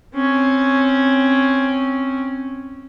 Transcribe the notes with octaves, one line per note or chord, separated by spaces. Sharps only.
C4 C#4